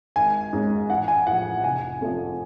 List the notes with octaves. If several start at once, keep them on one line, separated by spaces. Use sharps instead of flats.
G#1 G#5
G#2 G#3 C#4
A1 F#5
G#5
A2 F3 F#5
F1 G#5
F2 F3 A3 C#4